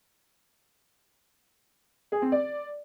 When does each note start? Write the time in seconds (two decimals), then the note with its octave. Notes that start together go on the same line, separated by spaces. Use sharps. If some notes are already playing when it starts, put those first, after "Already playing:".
2.12 G#4
2.22 C4
2.32 D5